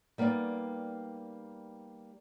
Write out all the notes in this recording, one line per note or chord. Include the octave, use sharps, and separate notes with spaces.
G3 A#3 B3 D#4 D5